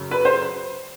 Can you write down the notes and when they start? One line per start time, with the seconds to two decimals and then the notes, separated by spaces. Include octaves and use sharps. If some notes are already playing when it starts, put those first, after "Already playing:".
Already playing: F#2 C#3
0.11 B4
0.25 C5